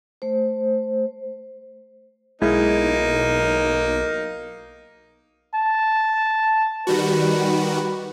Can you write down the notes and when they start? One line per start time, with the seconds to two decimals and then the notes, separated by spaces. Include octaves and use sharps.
0.22 A3 C5
2.42 B1 G#3 A#3 D#4 E4
5.55 A5
6.87 D#3 G3 F#4 B4